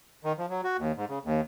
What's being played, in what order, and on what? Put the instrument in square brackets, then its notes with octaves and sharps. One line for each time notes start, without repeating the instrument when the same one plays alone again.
[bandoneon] D#3
F3
F#3
F#4
D#2
G#2
C#3
D#2